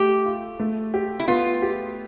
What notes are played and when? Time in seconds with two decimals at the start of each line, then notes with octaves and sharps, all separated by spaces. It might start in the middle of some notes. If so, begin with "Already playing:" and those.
Already playing: A3 G4
0.26 F4
0.60 A3
0.94 G4
1.20 E4
1.28 B3 F4
1.62 G4